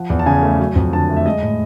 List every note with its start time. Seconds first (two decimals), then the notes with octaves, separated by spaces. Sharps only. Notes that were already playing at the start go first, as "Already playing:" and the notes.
Already playing: F3 F#5
0.10 E2
0.19 A5
0.26 C#3 G#5
0.43 A3
0.60 F#3
0.75 F2
0.93 D3 A5
1.09 A3
1.17 E5
1.26 G#3 D#5
1.43 A2